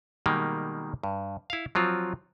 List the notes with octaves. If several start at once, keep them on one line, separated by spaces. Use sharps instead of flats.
B2 D#3 G3 G#3 A#3
G2
E4 F5
F3 F#3 C4 F4